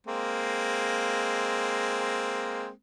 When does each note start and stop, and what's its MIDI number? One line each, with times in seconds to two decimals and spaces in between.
0.07 2.70 56
0.07 2.70 58
0.07 2.70 60